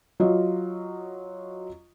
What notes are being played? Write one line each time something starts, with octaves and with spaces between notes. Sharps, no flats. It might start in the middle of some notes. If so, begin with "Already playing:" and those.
F#3 F4 D#5